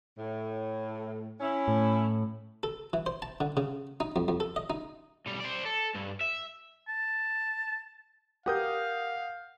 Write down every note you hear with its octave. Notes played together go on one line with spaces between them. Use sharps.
A2
C#4 E4
A2
A4
E3
C5
A5
D3
C#3
D#4
F2
F2
A4
D#5
D#4
B1 G3
C5 D5
A4
G2
E5
A5
G4 A#4 F5 F#5 D#6 G6